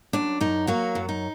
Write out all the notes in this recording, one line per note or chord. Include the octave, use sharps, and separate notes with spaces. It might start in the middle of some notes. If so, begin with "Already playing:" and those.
F#2 D4
F#2 D#4
F#3 A#3 F#4
F#2
D#4